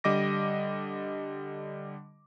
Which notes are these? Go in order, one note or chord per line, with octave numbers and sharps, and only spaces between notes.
D3 G3 D#5 D6 A#6